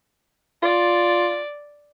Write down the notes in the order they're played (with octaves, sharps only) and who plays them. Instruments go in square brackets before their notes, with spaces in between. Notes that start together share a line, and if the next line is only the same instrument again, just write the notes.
[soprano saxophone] F4 [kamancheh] D5